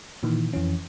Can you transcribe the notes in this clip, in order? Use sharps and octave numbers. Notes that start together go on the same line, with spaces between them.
A#2 D#3 E3
F2 E3 C#4